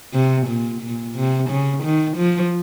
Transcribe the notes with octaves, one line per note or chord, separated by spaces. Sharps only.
C3
A#2
A#2
C3
C#3
D#3
F3